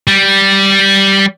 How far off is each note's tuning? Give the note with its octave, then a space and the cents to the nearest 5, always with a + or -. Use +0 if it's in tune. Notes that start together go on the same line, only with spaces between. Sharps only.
G3 -5